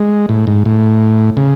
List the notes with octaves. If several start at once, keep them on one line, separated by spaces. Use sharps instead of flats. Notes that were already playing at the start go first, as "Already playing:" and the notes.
Already playing: G#3
A2
G#2
A2
C#3